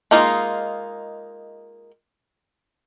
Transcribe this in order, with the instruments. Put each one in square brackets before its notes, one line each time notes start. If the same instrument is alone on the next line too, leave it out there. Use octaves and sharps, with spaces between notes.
[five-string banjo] G#3 A#3 D#4 F4